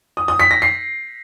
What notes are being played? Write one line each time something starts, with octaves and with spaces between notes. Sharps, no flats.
D#6
D#6
B6
A#6
C7